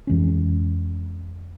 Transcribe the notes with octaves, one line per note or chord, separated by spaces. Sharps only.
F2 E3 G#3 C#4